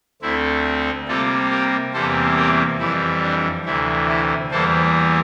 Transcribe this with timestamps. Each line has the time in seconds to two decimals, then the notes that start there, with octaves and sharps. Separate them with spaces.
0.22 D2 D3 A3 C4 E4
1.08 C3 G3 A#3 F4 A4
1.51 G4 A#4
1.93 E2 C3 E3 G3 A#3 A4 C5
2.36 G4 A#4
2.79 F2 E3 G3 E4
3.22 D4
3.65 D2 C3 E3 E4
4.08 E4
4.51 E2 E3 G3 A#3 A4 C5